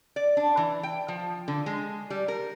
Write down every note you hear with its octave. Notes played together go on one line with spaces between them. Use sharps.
D5
D4
E3
G5
F3
D3
G#3
G3
A#4